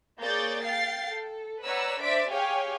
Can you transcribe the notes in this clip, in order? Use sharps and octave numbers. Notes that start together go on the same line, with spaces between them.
A#3 G#4 C#5 D5 G6 A6
F5 G5 A6 C7
A4
B4 C#5 D5 F#5 A#5 E6
D4 C5 D5 E5 B6 D7
G4 G#4 C#5 F5 G5 G#5